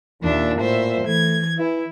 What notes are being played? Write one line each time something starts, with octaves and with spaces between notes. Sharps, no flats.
D#2 A#2 D4 E5
A2 C5 E5
E3 A3 G#6
E3 E4